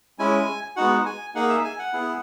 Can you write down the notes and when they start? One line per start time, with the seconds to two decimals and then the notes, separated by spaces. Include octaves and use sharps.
0.19 G#3 C#4 E4 G#5
0.76 G#3 B3 D#4 F#4 F#5
1.06 G#5
1.35 A#3 D#4 G#4 F#5
1.49 E5
1.65 G#5
1.79 F#5
1.93 B3 E4 G#4